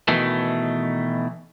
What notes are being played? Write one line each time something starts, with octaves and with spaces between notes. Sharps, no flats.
B2 D#3 E3 A3